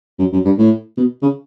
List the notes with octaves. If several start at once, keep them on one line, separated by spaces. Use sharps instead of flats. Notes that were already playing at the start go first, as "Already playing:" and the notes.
F#2
F#2
G2
A2
B2
C#3